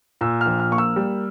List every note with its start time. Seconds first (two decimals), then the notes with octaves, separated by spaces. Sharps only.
0.21 A#2 E6
0.41 F6
0.46 A#1
0.60 F6
0.71 A#3 C#6
0.78 E6
0.96 G3